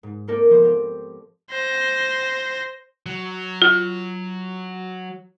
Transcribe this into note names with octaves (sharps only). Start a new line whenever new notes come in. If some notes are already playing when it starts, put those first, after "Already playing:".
G#2
A#3 C4 A4 A#4 C5 D5
F3 B3 C5
C4 G4
C5 A#6
F#3
F4